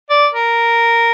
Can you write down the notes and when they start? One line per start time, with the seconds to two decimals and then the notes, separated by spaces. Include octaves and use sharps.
0.10 D5
0.34 A#4